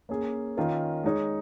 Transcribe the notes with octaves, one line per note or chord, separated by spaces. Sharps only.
A#3 C#4 G#4
D#3 C#4 F4 A#4
G#3 D#4 C#5